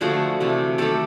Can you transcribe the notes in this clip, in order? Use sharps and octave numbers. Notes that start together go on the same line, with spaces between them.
D3 F3 A3 F#4 G#4
C3 E3 A3
D#3 F#3 A3 G4 A4